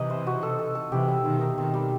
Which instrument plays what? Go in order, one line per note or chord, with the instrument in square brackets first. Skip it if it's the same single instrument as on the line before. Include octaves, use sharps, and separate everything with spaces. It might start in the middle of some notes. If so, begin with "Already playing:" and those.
Already playing: [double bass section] C3 E3 [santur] D#4 D#5
[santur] C5
F#4
A4
A4
A4
[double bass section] C3 E3 [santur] G4
[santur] E5
[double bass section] B2 D#3 [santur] C5
[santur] D#4
[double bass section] B2 D#3 [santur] C4
[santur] G3